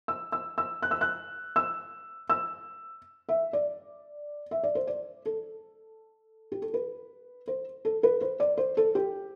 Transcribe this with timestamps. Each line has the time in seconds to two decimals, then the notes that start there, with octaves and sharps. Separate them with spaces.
0.08 E6
0.32 E6
0.58 E6
0.82 F#6
0.91 E6
1.01 F#6
1.56 E6
2.30 E6
3.29 E5
3.53 D5
4.51 E5
4.63 D5
4.75 C5
4.87 D5
5.26 A4
6.52 G4
6.62 A4
6.74 B4
7.47 C5
7.85 A4
8.03 B4
8.21 C5
8.40 D5
8.57 C5
8.77 A4
8.95 G4